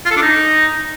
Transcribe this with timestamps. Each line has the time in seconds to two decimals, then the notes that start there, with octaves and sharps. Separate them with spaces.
0.05 F4
0.11 A4
0.16 D4
0.22 D#4